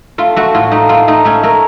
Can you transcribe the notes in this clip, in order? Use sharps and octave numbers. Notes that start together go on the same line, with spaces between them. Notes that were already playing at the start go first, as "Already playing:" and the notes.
A3 F4
A3 F#4
A2 F4
A3 D#4
A3 F4
A3 D#4
A3 C#4
A3 A#4